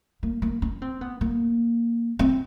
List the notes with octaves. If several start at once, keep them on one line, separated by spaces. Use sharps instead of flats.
A#3
A#3
C#4
C4
B3
A#3
C4